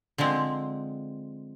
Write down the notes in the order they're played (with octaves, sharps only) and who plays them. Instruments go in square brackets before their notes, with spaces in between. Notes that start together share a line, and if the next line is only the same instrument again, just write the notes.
[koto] D3 F3 G#3 C4